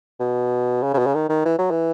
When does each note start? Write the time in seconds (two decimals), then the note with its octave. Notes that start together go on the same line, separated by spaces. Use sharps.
0.20 B2
0.83 C#3
0.93 C#3
0.98 B2
1.06 C#3
1.14 D#3
1.29 D#3
1.45 E3
1.58 F#3
1.71 E3